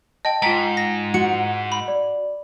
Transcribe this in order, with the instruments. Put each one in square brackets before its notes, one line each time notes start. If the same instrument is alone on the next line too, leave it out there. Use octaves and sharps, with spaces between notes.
[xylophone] D#5 G5 [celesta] A5
[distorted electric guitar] G#2 [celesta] F4 A#5 [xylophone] G5 B6
[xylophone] A#6
[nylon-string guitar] F#4 [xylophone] C#7
[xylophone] B5
[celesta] D5